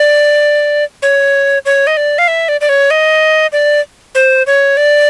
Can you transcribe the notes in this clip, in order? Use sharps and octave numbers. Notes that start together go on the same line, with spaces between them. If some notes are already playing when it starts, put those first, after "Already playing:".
Already playing: D5
C#5
C#5
D#5
D5
F5
E5
D5
D5
C#5
D#5
D5
C5
C#5
D5